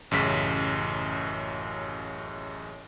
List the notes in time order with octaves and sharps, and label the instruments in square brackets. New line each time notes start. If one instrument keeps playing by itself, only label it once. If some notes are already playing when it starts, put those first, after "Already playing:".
[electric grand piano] A1 F#2 C#3 B6